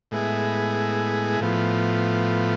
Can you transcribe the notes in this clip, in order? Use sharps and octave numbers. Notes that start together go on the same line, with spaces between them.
A2 G#3 B3 E4 G#4
A2 F3 B3